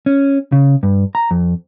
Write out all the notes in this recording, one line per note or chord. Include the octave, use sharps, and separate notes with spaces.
C#4
C#3
G2
A#5
F2